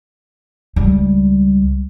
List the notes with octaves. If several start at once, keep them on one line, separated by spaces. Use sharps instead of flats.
C#2 G3